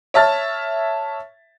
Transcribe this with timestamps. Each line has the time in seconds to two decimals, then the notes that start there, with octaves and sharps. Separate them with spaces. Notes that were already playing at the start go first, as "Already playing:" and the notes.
0.14 C#5 E5 A5 F6 A6